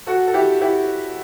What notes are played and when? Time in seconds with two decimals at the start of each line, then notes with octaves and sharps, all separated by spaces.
0.07 F#4 A4
0.27 A4
0.33 E4 G4
0.61 E4 G4